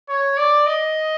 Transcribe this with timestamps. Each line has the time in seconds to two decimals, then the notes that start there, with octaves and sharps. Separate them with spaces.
0.09 C#5
0.38 D5
0.66 D#5